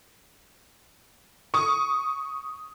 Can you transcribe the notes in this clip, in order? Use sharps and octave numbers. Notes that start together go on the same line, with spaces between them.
C#6 D#6